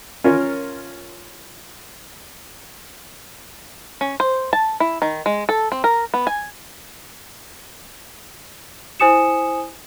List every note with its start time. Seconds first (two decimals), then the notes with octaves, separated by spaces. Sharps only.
0.24 C#4 F4 A#4 C#5
4.01 C#4
4.20 C5
4.53 A5
4.80 E4
5.02 D#3
5.26 G#3
5.49 A4
5.72 C4
5.84 A#4
6.14 B3
6.27 G#5
9.00 E4 C5 G#5 D#6 C#7 E7